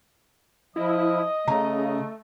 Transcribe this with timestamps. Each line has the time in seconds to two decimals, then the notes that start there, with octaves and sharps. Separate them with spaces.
0.76 F3 E4 D#5
1.48 C#3 A3 A#5